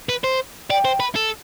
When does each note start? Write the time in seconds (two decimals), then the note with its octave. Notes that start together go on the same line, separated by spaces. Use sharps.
0.09 B4
0.24 C5
0.70 D5 G5
0.85 C5
1.00 B4
1.16 A4